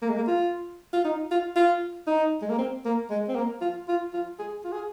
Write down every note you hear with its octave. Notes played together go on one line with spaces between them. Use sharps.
A#3
G#3
A#3
F4
F4
D#4
F4
F4
D#4
G#3
A#3
C4
A#3
G#3
C4
A#3
F4
F4
F4
G#4
F4
G#4